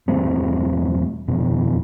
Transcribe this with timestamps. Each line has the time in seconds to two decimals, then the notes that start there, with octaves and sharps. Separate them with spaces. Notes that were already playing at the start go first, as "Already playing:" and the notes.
0.08 E1 G3 A3 C4
1.27 F1 B2